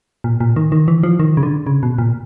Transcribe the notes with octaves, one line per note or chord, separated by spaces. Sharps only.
A#2
A#2
D#3
D#3
E3
F3
D#3
C#3
D3
C#3
B2
A#2